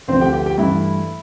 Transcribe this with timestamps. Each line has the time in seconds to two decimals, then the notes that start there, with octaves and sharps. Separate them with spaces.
0.08 D2 D3 F3 A3 C4 C5
0.21 G4 G5
0.33 G4 G5
0.46 G4 G5
0.58 G2 E3 A3 E4 E5